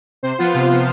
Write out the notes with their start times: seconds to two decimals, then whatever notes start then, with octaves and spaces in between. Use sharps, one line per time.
0.23 C3 C5
0.39 F3 B3 F4
0.54 C3 F4
0.70 F3 B3